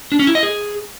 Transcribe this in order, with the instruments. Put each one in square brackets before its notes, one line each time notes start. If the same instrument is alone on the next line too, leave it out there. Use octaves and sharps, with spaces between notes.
[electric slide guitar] D4
C#4
E4
D#5
G#4